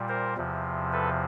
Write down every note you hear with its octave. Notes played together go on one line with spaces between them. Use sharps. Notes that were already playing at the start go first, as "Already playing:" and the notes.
Already playing: A#2 G3
A#4 C5
E2 C3 F3
A4 B4